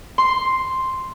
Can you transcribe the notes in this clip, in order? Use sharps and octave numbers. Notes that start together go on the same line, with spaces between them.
C6